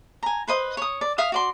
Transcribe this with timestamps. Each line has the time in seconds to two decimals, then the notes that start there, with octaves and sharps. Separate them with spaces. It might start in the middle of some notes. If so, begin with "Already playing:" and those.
0.23 G#5 A#5
0.47 B4 C5 D#5
0.77 C#5 D#6
1.01 D5
1.18 E5 F5 D#6
1.32 F#4 D5 C6